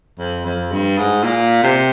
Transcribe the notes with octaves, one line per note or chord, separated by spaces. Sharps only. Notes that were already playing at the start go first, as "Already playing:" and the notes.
F2
F2
G2
G#2
A#2
C3